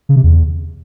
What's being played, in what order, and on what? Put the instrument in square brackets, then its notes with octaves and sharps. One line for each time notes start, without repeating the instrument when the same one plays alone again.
[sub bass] C#3
C3
E2